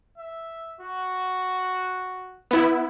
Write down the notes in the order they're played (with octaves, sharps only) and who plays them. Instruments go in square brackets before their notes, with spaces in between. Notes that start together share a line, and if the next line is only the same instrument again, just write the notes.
[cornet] E5
F#4
[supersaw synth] B3 E4